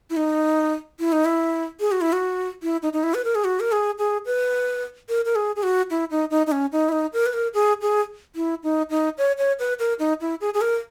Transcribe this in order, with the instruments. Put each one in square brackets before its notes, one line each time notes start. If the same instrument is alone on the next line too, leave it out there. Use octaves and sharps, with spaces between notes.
[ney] E4
D#4
E4
D#4
E4
G#4
F#4
E4
F#4
E4
D#4
D#4
E4
B4
A#4
G#4
F#4
A#4
G#4
G#4
B4
A#4
A#4
G#4
G#4
F#4
E4
D#4
D#4
D#4
C#4
D#4
E4
D#4
A#4
B4
A#4
G#4
G#4
E4
D#4
D#4
C#5
C#5
B4
A#4
D#4
E4
G#4
G#4
A#4